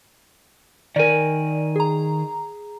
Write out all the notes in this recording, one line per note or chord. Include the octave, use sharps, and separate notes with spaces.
D#3 A#4 D5 G#5
G#4 A#5